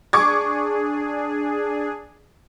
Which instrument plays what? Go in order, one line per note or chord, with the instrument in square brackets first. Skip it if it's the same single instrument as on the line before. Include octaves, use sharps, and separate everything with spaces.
[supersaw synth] D4 G#4 [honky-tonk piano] C#6 D6 G#6